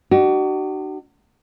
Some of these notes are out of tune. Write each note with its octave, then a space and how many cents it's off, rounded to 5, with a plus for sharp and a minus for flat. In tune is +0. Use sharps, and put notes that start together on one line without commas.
D4 +45 F#4 +40